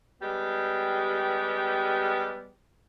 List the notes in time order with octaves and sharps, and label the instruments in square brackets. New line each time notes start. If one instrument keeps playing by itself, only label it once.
[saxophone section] G3 G#3 B3 G4